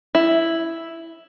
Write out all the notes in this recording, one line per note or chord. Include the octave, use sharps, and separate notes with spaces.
E4